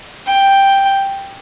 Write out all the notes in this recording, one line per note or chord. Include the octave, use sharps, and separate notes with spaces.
G5